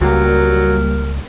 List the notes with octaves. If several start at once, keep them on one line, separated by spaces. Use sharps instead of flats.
C#2 F#3 G3 A#3 A#4